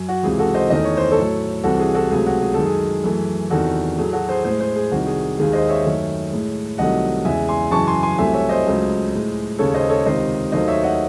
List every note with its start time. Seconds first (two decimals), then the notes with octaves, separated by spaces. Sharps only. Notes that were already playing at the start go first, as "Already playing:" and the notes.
Already playing: F#2
0.08 F#4
0.23 C#2 C3 E3 G#4
0.39 F#4 A4
0.54 C5 D#5
0.70 E2 D#3 A3 D#5
0.84 C#5
0.97 C5
1.11 A4 C#5
1.18 A2 F#3 A3
1.64 C2 C3 E3 F#4 A4
1.79 G#4
1.95 F#4 A4
2.11 C#2 C3 F#3 A3 G#4
2.26 F#4
2.41 G#4
2.54 F#2 D#3 G#3 A4
2.66 G#4
3.04 F#2 E3 A3
3.50 E2 C3 D#3 F#4 A4
3.97 A2 F#3 A3 G#4
4.13 F#4 A4
4.29 G#4 C5
4.44 A2 G#3 G#4 C5
4.60 G#4 C5
4.76 G#4
4.91 C2 C3 D#3 F#4
5.06 G#4
5.38 D#2 D#3 G#3 G#4
5.53 C5 D#5
5.69 C#5 E5
5.84 F#2 D#3 A3
6.32 A2 G#3
6.78 C2 C3 D#3 F#3 A3 D#5 F#5
7.25 E2 C#3 G#3 E5 G#5
7.48 G#5 C6
7.71 F#2 C#3 E3 G#3 A5 C#6
7.87 G#5 C6
8.03 G#5 C6
8.18 C2 C3 F#3 A3 E5 G#5
8.34 C#5 E5
8.49 C5 D#5
8.66 C#2 C#3 F#3 A3
9.12 A2 G#3
9.59 D#2 C#3 G#3 A4 C#5
9.74 C5 D#5
9.89 A4 C#5
10.06 C#2 C3 D#3 C5 D#5
10.52 D#2 D#3 F#3 A3 C5 D#5
10.68 C#5 E5
10.84 D#5 F#5